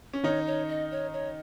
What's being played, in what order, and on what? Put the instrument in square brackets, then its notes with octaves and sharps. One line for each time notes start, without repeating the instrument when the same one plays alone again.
[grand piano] C#4
[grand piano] D#3 D#4 [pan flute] C#5
[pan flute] C#5
D#5
C#5
C#5